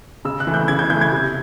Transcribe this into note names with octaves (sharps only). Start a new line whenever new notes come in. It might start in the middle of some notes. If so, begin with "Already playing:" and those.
C#3 E6
F#6
E3 A3
G6
C#3 G#6
G6
E3 A3 G6
G#6
C3